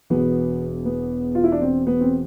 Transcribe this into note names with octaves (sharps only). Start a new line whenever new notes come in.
E1 E2 B2 B3
B3
F4
E4
D4
C4
B3
C4